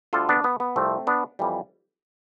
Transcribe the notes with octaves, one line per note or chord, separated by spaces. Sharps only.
D2 D3 G3 F4 A4
B3 D4
B3
B3
C2 C3 F3 A3 C4
B3 D4
F2 E3 G3